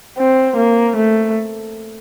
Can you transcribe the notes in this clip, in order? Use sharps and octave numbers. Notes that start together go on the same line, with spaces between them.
C4
A#3
A3